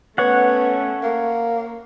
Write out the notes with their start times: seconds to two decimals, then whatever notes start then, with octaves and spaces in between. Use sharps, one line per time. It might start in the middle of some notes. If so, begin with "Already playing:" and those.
0.18 A3 B3 C#4 C#5 F#5
1.03 A#3